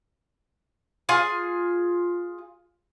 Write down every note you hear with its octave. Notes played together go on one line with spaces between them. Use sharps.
F4 G#4 G#5